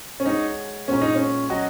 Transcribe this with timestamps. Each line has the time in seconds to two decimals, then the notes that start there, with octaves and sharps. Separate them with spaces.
0.20 C#4
0.25 G#3 D#4 F#4 C#5
0.88 A#2 G#3 C#4 F#4 A#4
1.02 D#4
1.15 C#4
1.49 F#3 C#4 F#4 D#5